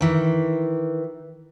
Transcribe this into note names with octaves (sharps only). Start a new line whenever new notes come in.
D#3 E3